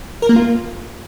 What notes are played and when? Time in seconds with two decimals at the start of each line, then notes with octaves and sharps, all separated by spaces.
0.22 A#4
0.29 A#3
0.36 F4